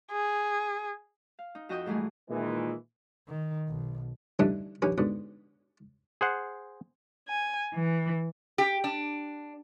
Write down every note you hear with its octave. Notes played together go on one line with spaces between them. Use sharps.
G#4
F5
D#4
F2 F#4 D#5 G5 D#6 G6
G#2 E3 G3 A3 G#4
A#2 D#3 E3 G#3
D#3
B1
D3 E3 G3 A3 D4 D#4
A#1 D#2 C#4 B4
G#2 B2 D3
G#4 C5 F#5
G#5
E3
G4
D4